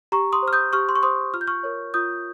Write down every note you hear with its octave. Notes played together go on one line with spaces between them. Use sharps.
G4 A#5 C#6
C6 D#6
C5
F6
D#6 G6
G4 C#6 F6
C6
C#6
C5 C6 D#6
F4 F6
G6
C#6 F6
A#4 C#5
F4 D#6 G6